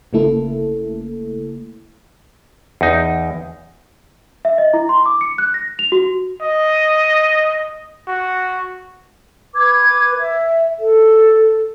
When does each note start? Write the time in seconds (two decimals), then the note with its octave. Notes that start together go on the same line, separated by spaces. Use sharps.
0.13 G1 C#3 A3 A#3 E4 A4
2.81 E2 D#4
4.45 E5
4.58 D#5
4.74 E4
4.89 C6
5.06 D6
5.21 C#7
5.38 F#6
5.54 A#6
5.79 F7
5.92 F#4
6.42 D#5
8.08 F#4
9.55 B4 D6 G#6
10.19 E5
10.80 A4